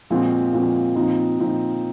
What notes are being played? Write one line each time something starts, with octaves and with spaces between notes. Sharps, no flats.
A#2 F3 G#3 C4 F#4
A#2 F3 G#3 C4 F#4
A#2 F3 C4 D#4
A#2 F3 C4 D#4